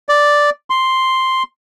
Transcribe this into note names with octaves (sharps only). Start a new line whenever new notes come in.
D5
C6